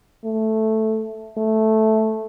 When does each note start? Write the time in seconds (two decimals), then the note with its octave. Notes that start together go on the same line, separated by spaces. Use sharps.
0.25 A3
1.38 A3